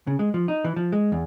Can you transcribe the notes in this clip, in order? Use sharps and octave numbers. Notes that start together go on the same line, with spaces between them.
C#3
G#3
F3
D#4
E3
F3
G#3
E2